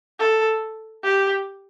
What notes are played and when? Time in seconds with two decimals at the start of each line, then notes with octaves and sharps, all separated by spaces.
0.20 A4
1.04 G4